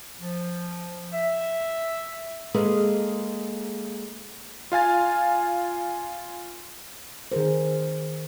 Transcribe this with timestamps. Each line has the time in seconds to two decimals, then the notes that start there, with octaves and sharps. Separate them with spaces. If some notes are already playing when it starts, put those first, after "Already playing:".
0.20 F3
1.12 E5
2.54 G#3 A#3 G#4 A4 B4
4.72 F4 F5 G#5 A6
7.32 D#3 G#4 A#4 C5